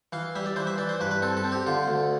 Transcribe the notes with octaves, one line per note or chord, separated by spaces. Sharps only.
E3 F5
G3 E5
D5
E3 C5
E5
E3 D5
C5
G2 B4
B4
C4 A4
A4
C4
G4
D3 F4
D2